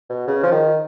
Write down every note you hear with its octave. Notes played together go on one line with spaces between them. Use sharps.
B2
C#3
F3
D#3